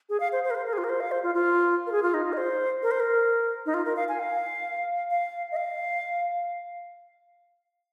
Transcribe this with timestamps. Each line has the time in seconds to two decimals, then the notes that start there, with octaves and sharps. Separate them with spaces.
0.09 G#4
0.20 F5
0.32 C5
0.44 C5
0.51 A#4
0.55 C5
0.66 A#4
0.73 G#4
0.78 F4
0.84 A#4
0.89 C5
1.00 F5
1.12 C5
1.23 F4
1.35 F4
1.87 A#4
1.92 G#4
2.03 F4
2.14 D#4
2.26 F4
2.33 D#5
2.37 C5
2.83 A#4
2.91 C5
3.00 A#4
3.66 D#4
3.74 F4
3.86 A#4
3.96 F5
4.09 G#5
4.19 F5
5.11 F5
5.52 D#5
5.56 F5